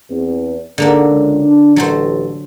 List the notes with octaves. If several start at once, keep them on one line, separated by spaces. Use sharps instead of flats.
E2 C4
D3 D#3 A#3 D4 G#4 F#5
C#2
D4
A1 F#3 A4 C5